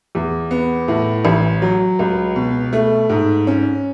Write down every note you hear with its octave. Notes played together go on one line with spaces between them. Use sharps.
E2
B3
A2
A1
F#3
C#2
B2
A3
G#2
C#4